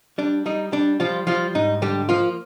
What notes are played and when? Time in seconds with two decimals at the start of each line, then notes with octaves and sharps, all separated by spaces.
0.18 G3 D4
0.46 G3 D#4
0.72 G3 D4
1.00 F3 G3 F4
1.27 F3 G3 F4
1.55 G#2 D#4
1.82 D3 G3 G4
2.09 F3 A#3 F4